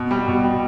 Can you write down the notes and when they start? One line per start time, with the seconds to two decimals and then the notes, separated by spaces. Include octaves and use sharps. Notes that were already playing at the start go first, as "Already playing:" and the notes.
Already playing: B2
0.11 G3
0.28 B2
0.44 G3